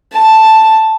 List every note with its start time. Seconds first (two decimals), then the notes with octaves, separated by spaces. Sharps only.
0.13 A5